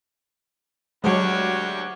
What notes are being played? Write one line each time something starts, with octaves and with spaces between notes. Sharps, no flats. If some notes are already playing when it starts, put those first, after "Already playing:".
D2 F#3 G#3 D4 F#4 G4 C#5